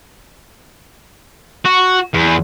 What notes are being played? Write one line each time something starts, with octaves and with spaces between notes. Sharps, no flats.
F#4
E2